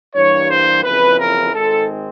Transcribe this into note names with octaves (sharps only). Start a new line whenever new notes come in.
G2 E3 G3 A#3 C#5
C5
F#1 F2 C#3 E3 B4
A#4
G#1 G#2 D#3 G#3 C4 A4